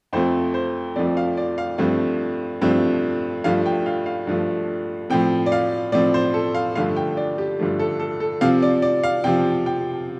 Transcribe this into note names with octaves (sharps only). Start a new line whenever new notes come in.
F2 F3 A3 C4 C5
C5
F2 F3 A3 C4 D5
F5
D5
F5
G2 F3 A3 C4
G2 F3 A3 C4
G2 F3 A3 F5
G5
F5
F5
G2 F3 A3
A2 F3 C4 G5
D5
F5
A2 F3 C4 D5
C5
A4
F5
G2 D3 F3 A3 F5
G5
D5
G4
G2 D3 F3 A3
A4
A4
A4
C3 F3 C4 F5
D5
D5
F5
C3 F3 C4 G5
G5